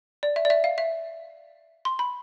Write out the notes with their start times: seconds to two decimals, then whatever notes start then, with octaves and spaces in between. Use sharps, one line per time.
0.23 D5
0.36 E5
0.45 D5
0.50 E5
0.64 F5
0.78 E5
1.85 C6
1.99 B5